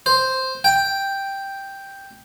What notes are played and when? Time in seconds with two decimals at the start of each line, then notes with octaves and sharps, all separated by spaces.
0.06 C5
0.64 G5